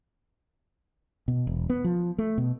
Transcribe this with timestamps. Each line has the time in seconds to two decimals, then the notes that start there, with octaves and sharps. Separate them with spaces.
1.28 B2
1.47 E1
1.70 B3
1.84 F3
2.18 A3
2.38 B2